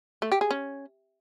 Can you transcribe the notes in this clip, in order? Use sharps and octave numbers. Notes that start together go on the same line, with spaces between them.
A3
G4
G#4
C#4